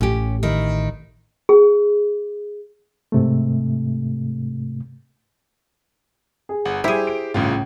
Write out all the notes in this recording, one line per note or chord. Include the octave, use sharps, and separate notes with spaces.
A1 C#4 G4
D#3 E4
G#4
G#2 C3 A3
G#4
G1 F#5
G3 E4 G4 G#4 C5
D7
G1 C2 A2 C#3 F4